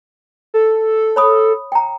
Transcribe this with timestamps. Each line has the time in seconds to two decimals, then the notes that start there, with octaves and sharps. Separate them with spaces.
0.54 A4
1.16 C#5 B5 D#6
1.72 G5 A#5